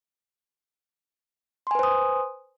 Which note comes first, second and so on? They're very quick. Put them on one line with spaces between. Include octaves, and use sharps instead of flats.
C6 G#5 B4 C5 D#6